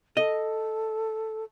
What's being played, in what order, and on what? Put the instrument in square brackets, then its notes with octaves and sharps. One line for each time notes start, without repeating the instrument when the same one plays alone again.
[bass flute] A4 [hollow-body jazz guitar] D#5